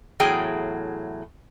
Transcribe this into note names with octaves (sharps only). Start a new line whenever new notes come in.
E2 A2 F#3 G#4 G5